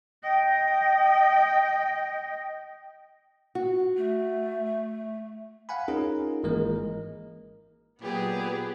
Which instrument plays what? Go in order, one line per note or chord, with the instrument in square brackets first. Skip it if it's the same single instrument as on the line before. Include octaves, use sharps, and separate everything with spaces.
[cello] D#5 G5
[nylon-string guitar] F#4
[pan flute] A3
[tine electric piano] F5 F#5 G#5 B5
C#4 D#4 F4 G#4 A#4
G#1 E3 G#3 A#3 A#4 D#5
[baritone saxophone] A#2 [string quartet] F#3 G4 B4 [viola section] B3 G#4